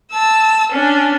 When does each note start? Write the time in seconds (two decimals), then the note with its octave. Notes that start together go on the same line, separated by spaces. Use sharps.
0.12 A5 E6
0.72 C#4 D4